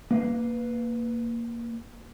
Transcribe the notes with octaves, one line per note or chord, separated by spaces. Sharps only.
A#3 B4 F5